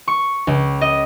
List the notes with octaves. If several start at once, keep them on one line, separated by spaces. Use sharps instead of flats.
C#6
C#2
D#5